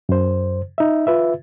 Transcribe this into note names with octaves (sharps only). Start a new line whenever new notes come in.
F#2 C5
D#4 E5
F4 B4 E5